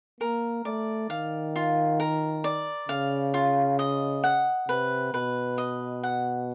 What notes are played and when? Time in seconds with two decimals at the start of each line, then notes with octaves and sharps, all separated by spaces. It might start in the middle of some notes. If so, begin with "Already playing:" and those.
0.20 A#3 A#4
0.65 A3 D5
1.10 D#3 F5
1.56 F4
2.00 A#4
2.44 D5
2.89 C#3 F5
3.34 F4
3.79 D#5
4.24 F#5
4.68 C3 B4
5.13 B2 B4
5.58 D#5
6.03 F#5